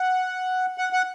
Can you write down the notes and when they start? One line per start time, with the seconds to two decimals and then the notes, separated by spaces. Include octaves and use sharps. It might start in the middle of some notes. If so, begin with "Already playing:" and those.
Already playing: F#5
0.78 F#5
0.93 F#5